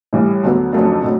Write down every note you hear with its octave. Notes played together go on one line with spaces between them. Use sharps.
A2 E3 G3
D2 D3 F#3 B3
F2 C#3 F#3 A3 D4
A2 F#3